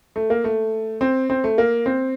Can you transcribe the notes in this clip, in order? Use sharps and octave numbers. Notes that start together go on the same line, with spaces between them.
A3
A#3
A3
C4
C4
A3
A#3
C4